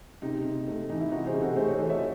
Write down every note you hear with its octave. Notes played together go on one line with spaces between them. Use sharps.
C3 D#4
C3
A3
E3 D#4
E4
C3 D#4 F#4
G#4 C5
C3
F#4 A4
A3 G#4 C5
A4 C#5
E3 C5 D#5
C#5 E5